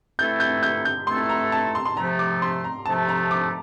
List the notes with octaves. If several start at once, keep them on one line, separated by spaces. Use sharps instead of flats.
E3 A3 C4 E4 A4 G6
G6
G6
G6
E3 A3 C4 E4 A4 C6
A#5
A5
C6
C6
C3 F3 A3 A#5
D6
C6
A#5
C3 F3 A3 A5
A#5
D6